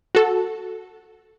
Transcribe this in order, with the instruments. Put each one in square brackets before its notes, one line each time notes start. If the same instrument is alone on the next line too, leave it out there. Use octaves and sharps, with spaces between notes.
[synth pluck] F#4 A4